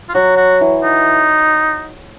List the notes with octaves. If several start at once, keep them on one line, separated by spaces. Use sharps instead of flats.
F4
F#3 F#4
F#4
E3
D#4